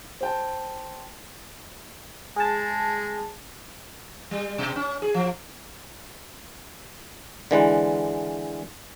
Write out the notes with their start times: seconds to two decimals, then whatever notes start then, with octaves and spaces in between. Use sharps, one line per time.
0.21 C5 G5 A5
2.36 G#3 G#4 A5
4.31 G3
4.58 B2
4.76 C#4
5.02 G#4
5.14 F3
7.51 D3 E3 G#3 B4